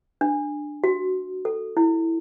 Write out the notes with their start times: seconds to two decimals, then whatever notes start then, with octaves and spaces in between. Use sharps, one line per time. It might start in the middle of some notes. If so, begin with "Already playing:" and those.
0.21 D4
0.84 F#4
1.45 A4
1.77 E4